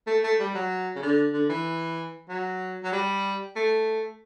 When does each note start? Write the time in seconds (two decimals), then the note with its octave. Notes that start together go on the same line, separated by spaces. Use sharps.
0.07 A3
0.23 A3
0.39 G3
0.54 F#3
0.95 C#3
1.02 D3
1.33 D3
1.49 E3
2.29 F#3
2.84 F#3
2.92 G3
3.56 A3